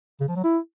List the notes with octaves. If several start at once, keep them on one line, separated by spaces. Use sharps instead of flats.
C#3
F3
F#3
E4